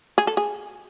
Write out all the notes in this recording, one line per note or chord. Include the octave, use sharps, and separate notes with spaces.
G#4
A4
G#4